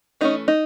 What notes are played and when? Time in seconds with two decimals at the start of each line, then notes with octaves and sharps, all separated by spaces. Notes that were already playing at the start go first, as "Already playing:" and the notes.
0.21 E3 A3 C#4 D#4
0.48 D#4